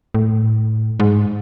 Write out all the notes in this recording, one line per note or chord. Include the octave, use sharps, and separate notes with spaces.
A2
G#2